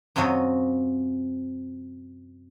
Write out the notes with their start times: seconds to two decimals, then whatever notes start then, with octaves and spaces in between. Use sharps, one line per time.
0.16 F#2 C3 F4 C#5 D#5